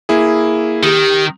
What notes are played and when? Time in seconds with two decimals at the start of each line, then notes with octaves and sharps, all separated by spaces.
0.09 A#3 E4 G#4
0.83 D#3 G4